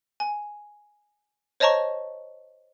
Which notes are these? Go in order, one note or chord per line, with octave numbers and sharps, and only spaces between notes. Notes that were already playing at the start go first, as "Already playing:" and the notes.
G#5
C5 C#5 D#5 A5 A#5 C#6